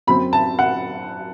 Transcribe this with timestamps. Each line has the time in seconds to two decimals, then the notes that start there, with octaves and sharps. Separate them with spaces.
0.07 F#2 F#3 C4 B5
0.33 A5
0.59 F#5